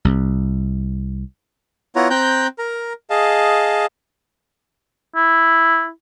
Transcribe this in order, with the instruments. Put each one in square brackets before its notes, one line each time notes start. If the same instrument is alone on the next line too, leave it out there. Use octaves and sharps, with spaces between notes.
[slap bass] C2
[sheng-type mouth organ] B3 E4 F4 C#5 F#5 A#5
C4 G5 A#5 F#6 G6
A#4 A#5
G#4 D#5 F5 A5
[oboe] E4